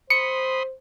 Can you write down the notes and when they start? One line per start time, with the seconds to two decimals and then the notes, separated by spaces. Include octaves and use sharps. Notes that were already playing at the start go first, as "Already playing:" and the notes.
0.10 C5 B5 C6 D#6 C#7